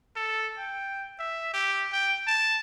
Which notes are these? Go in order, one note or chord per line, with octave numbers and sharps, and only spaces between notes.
A4
G5
E5
G4
G5
A5